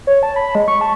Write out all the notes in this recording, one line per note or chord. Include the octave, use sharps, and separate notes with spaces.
C#5
A5
B5
G#3
C#6
A5